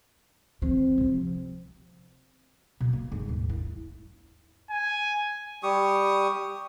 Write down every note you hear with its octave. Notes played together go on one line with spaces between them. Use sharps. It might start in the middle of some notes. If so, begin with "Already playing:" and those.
E3 F3 C4
C3 F3
B2
A#3
G#2
D#2
E4
G#5
G3 G4 C#6 D#6